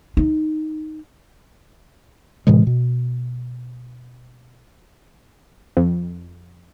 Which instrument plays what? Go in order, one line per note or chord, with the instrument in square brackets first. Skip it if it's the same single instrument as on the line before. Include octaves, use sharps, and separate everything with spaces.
[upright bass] D#4
[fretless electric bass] A2 C3 E3 G#3
B2
[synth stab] F2